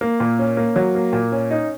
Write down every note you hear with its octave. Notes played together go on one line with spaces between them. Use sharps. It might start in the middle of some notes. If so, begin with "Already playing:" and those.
A#3
A#2
C#4
A#3
F#3
A#3
A#2
C#4
D#4